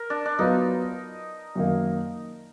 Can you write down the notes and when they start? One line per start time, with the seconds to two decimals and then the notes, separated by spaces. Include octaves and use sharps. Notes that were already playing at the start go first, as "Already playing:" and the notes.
Already playing: A#4
0.10 D4
0.25 D4
0.39 F#3 B3 D#4 F4
1.56 F#2 D#3 A#3